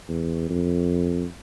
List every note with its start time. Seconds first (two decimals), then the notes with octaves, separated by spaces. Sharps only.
0.08 E2
0.50 F2